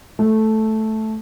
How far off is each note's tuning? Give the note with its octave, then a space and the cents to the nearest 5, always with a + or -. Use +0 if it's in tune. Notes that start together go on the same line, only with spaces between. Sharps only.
A3 -5